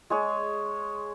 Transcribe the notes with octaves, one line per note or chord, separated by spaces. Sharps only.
G#3 G#4 C#5